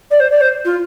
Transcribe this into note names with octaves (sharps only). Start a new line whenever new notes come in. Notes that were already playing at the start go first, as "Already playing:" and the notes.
D5
C5
D5
C5
F4